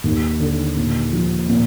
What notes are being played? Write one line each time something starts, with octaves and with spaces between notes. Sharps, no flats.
D#2
D3
A#2
F3
A#2